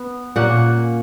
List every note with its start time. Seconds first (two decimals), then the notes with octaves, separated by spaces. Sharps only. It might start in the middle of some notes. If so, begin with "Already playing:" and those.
Already playing: B3
0.36 A#2 A#3 C#4 F#5